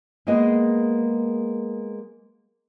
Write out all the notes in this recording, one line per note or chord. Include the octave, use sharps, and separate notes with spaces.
G#3 A#3 B3 G#4 D#5